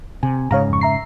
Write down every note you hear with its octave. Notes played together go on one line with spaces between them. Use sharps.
C3 G#5
G#2 C#3 C#5 F5 A#5
F2 C#6
E5 A#5 C7